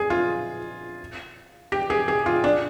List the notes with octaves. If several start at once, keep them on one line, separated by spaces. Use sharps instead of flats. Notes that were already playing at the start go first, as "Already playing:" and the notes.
Already playing: G#4
F4
G4
G#4
G#4
F4
D4